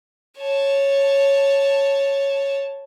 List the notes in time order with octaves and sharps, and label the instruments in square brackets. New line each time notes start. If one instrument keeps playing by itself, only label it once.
[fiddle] C#5 A5